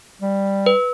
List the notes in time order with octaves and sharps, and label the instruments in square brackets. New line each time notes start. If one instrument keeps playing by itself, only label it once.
[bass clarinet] G3
[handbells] B4